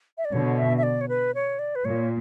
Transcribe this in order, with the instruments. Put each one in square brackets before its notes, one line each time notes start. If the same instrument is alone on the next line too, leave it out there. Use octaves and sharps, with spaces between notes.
[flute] E5
D5
[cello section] B2 D3 [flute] C#5
[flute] E5
E5
D5
C#5
B4
C#5
D5
B4
[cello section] A#2 [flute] C#5